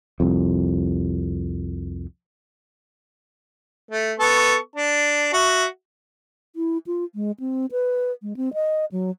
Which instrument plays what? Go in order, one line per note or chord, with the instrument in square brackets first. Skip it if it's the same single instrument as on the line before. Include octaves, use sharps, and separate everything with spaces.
[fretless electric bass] C2 F2
[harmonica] A3
B3 A4 C#6
D4 A5
F#4 E5
[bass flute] E4
F4
G#3
C4
B4
G#3
C4
D#5
F#3